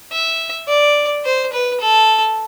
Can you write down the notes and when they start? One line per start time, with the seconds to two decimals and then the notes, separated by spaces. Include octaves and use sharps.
0.12 E5
0.68 D5
1.25 C5
1.52 B4
1.81 A4